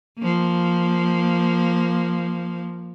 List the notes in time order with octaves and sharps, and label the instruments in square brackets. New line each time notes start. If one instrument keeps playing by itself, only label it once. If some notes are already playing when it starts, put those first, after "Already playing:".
[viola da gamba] F3 A#3